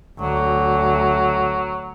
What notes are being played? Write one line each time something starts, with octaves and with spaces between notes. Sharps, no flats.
D2 F#3